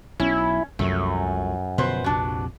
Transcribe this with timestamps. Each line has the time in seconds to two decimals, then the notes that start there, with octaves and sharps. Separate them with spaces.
0.20 B1 C#4 E4
0.79 C2 F#2 F3 F#3 A3
1.78 B2 D3 F3 B4 C5
2.04 A#1 F2 C3 D4 F#4